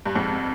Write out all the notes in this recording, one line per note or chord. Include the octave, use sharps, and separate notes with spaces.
G2
F2 G#2 G#3
C4